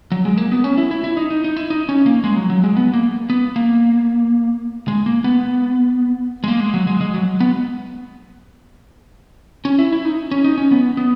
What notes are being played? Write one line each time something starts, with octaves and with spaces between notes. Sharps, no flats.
F#3
G#3
A#3
B3
C#4
E4
E4
E4
D#4
D#4
D#4
E4
D#4
C#4
A#3
G#3
F#3
F#3
G#3
B3
A#3
B3
A#3
G#3
A#3
B3
G#3
A#3
G#3
F#3
G#3
G#3
F#3
B3
C#4
E4
E4
D#4
C#4
D#4
C#4
B3
B3